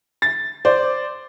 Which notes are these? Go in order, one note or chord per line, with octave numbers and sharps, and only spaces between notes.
A6
C5 D5